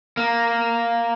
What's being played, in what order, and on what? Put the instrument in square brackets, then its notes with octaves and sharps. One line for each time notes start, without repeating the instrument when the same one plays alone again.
[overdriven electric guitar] A#3